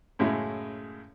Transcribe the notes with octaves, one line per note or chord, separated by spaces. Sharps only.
F#2 A2 C#3 G#3 E4 G#4